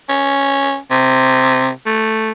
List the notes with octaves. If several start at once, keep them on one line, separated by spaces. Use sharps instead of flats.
C#4
C3
A3